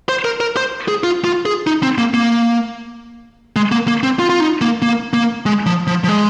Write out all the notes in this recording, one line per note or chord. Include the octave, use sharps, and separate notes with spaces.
C5
A#4
A#4
C5
G#4
F4
F4
G#4
D#4
C4
A#3
A#3
G#3
A#3
A#3
C4
F4
F4
D#4
A#3
A#3
A#3
G#3
F3
F3
F3
G#3